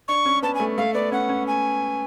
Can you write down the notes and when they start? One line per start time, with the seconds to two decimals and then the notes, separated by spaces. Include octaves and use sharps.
0.08 D4 C#6
0.26 C#4
0.43 B3 A5
0.55 A3 G#5
0.78 A3 F5
0.94 B3 D5
1.12 C#4 F#5
1.29 C#4
1.47 G#5